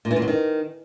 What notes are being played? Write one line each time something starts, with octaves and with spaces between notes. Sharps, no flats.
A#2
E3
A#2
F#3
D#3